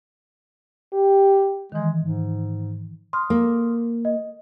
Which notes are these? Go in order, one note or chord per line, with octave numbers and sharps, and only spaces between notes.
G4
D#3 E3 G#3
G#2
C6 D#6 F6
A#3
D#5